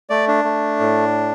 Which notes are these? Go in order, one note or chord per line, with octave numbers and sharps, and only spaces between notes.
A3 D5
D4
A3
A2